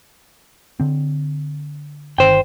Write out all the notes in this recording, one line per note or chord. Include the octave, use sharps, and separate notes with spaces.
D3 C4
G1 D#3 C5 G5